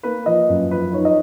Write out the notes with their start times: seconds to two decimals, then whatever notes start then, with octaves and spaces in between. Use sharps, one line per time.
0.03 A#3 B4
0.26 F3 D#5
0.49 F#2
0.71 F3 B4
0.93 D#4 C#5
1.05 D#5